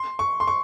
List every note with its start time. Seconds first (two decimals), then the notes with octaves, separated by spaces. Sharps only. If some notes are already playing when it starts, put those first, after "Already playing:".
Already playing: C6
0.19 C#6
0.40 C6
0.47 C#6